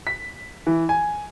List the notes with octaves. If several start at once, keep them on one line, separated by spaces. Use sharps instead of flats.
B6
E3
G#5